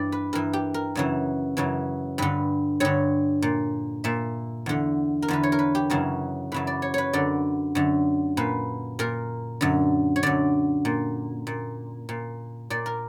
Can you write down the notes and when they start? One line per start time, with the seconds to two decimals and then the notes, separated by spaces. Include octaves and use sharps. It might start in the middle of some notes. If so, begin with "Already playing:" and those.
Already playing: G2 E3 D5 E5
0.12 B4
0.33 G2 E3 A#4
0.53 G4
0.74 A#4
0.95 F#2 C#3 E3
1.57 F#2 C#3 E3
2.18 G2 D3 B4
2.80 G2 D3 C#5
3.42 A#2
4.04 A#2 E5
4.66 E2 D3
5.22 A#4
5.28 E2 D3 B4
5.43 C#5
5.52 A#4
5.59 B4
5.75 G4
5.90 F#2 C#3 E3 A#4
6.52 F#2 C#3 E3 B4
6.67 D5
6.82 C#5
6.94 B4 C#5
7.13 F#2 D3 D5
7.75 F#2 D3
8.37 A#2 B4
8.99 A#2 A#4
9.61 F#2 D3
10.16 C#5
10.23 F#2 D3 D5
10.85 A#2
11.47 A#2
12.09 A#2
12.70 A#2 D5
12.86 A#4